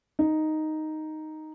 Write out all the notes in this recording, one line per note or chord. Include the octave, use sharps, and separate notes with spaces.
D#4